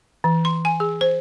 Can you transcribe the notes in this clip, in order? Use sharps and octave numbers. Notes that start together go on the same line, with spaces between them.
E3
C6
G#5
G#4
C5